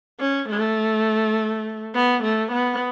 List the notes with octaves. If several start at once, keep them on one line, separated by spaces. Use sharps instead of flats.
C#4
A3
B3
A3
B3